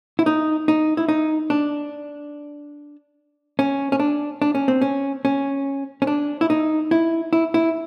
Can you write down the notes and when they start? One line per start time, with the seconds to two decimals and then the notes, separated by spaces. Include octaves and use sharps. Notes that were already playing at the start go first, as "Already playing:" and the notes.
0.19 E4
0.26 D#4
0.68 D#4
0.97 E4
1.09 D#4
1.50 D4
3.59 C#4
3.92 C#4
4.00 D4
4.42 D4
4.55 C#4
4.68 C4
4.82 C#4
5.25 C#4
6.02 C#4
6.07 D4
6.41 E4
6.50 D#4
6.91 E4
7.33 E4
7.54 E4